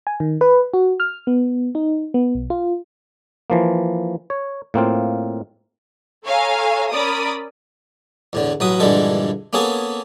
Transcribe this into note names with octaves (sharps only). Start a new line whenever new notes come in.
G#5
D#3
B4
F#4
F6
B3
D#4
B3
B1
F4
E3 F3 A#3
C#5
A2 A#3 C4 F4
A4 C#5 F5 G#5 A#5
C#4 A#4 D5 B5 D#6
E2 A2 D3
A1 F#3 B4 D#6
A#1 G2 D3 E3 G#3 A4
A#3 B3 C#4 G#4 A4